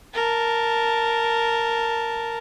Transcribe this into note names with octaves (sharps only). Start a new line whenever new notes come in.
A#4 A5